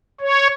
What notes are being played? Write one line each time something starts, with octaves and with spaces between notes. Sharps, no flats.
C#5